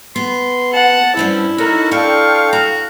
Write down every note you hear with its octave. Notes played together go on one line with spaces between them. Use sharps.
B3 C6
F#5 A5
G2 C4 C#4 E4
C#4 D#4 F#4 A4 A#4
D4 F4 A4 F5 G5 C#6
F#4 A#5